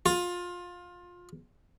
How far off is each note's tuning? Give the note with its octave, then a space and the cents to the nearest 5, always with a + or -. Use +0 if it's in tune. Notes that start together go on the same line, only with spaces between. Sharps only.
F4 +20